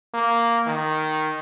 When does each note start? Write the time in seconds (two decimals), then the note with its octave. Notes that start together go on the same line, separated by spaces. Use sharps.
0.14 A#3
0.67 D#3